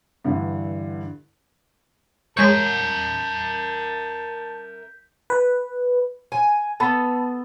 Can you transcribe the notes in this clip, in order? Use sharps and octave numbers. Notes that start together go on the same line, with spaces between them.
G2 D3 E3
G#3 A#4 C#5 E5 A5 G6 B6
B4
G#5
B3 A4 A5 B5